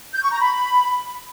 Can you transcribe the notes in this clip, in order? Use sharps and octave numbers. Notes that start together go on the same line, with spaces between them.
G6
C#6
A#5
B5